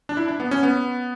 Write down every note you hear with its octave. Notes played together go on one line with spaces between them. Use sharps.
D4
E4
D4
B3
C#4
B3